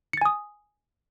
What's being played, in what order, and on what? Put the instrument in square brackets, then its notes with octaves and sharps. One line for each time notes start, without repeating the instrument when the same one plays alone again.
[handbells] C#7
A6
G#5
D#6